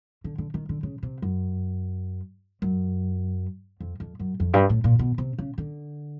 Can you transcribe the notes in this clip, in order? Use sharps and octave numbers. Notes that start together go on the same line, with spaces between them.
D3
D3
D#3
D3
C#3
C3
F#2
F#2
F2
F2
F#2
F2
G2
A2
A#2
B2
C3
C#3
D3